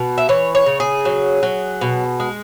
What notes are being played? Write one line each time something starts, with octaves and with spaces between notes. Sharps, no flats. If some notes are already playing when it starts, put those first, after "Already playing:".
Already playing: B2
E5
E3 C#5
C#5
C#3
G#4
F#3
F#3
B2
G#3